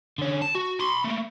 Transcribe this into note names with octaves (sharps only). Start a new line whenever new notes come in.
D3 C#4
A5
F#4
B5 C6
A3 A#3